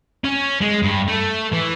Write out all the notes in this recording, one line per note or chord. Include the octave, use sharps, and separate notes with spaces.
C#4
G#3
G2
A3
E3